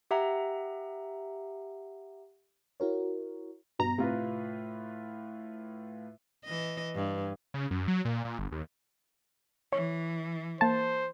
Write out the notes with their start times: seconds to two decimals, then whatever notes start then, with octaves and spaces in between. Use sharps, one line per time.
0.11 G4 E5 F#5 A#5
2.80 E4 F#4 A#4 C#5
3.79 G2 B2 A#5
3.98 A2 C3 F4 B4
6.45 E3 D#5
6.95 G2
7.54 C#3
7.71 F#2
7.88 F#3
8.05 A#2
8.25 A#2
8.39 G1
8.52 D#2
9.72 E3 C#5
10.61 A#3 C5 A5